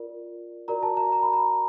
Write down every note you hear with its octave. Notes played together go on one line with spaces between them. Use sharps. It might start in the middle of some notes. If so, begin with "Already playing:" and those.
Already playing: F4 A#4 D5
F#4 A#4 D5 A#5
A5
A#5
A#5
B5
A#5